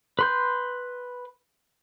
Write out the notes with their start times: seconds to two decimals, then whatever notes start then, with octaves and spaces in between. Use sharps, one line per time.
0.19 B4 C6 G6